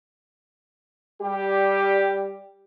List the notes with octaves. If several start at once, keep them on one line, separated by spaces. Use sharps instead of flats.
G3 G4